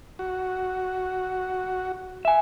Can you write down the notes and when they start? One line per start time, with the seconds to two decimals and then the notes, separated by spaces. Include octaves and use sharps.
0.19 F#4
2.25 E5 G#5